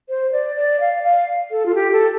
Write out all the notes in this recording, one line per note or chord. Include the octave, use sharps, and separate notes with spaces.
C5
D5
D5
F5
F5
A4
F4
G4
A4